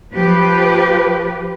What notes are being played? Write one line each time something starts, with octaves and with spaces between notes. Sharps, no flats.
F3 G4 B4